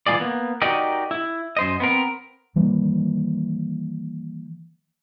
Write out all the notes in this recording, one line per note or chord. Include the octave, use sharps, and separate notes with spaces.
E3 G#3 A#3 F4 G#4 D5
A#3 B3
D#4 F#4 G4 A#4 D5 D#5
E4
F#2 C5 D#5
B3 C4 A#4
D#3 E3 G3 A#3